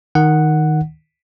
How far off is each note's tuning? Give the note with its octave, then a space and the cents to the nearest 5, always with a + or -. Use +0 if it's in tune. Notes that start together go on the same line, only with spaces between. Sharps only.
D#3 +0 F#5 +0